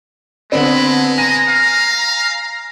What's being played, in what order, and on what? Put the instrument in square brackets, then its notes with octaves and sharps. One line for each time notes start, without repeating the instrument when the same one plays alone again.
[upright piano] D3 B3 C4 [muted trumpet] G#3 [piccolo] B5
[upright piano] G#5 A#6 D#7 [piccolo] A#5
[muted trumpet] F5